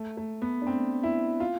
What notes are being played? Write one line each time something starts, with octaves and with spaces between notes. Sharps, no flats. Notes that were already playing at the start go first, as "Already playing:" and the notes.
Already playing: A3
A3
B3
D4
C4
E4
F4